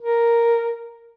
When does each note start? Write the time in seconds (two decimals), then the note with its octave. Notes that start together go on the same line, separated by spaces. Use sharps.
0.01 A#4